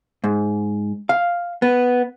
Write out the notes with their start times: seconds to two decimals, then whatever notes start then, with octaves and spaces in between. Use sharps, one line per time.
0.24 G#2
1.09 F5
1.62 B3